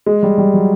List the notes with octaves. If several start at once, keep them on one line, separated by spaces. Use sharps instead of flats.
G#3
G3
G3
F#3